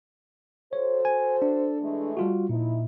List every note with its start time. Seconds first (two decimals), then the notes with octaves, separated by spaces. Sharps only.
0.73 F#4 A4 C5 C#5
1.05 G#5
1.42 D4
1.81 E3 G#3 A3
2.17 G3 F4 F#4
2.49 A#2 F3 D#4 E4